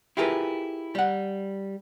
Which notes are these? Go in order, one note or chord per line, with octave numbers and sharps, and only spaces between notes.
E4 F4 G4 G#4 A#4 B4
G3 F#5